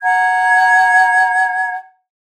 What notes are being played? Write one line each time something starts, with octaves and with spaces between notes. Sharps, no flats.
F#5 A#5 G#6